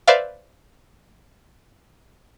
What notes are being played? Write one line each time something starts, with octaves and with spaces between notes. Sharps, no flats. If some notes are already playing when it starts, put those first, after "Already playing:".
B4 C5 D5 E5 F5